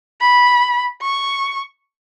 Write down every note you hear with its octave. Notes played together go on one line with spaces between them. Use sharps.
B5
C#6